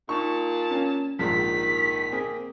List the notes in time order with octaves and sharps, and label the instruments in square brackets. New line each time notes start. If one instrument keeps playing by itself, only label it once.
[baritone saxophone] A#2 [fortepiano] D#4 C#6 [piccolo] A5
[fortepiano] C#4
[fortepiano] A#1 G#2 F3 [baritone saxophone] D#3 [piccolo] B6
[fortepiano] A#3 C4 G#4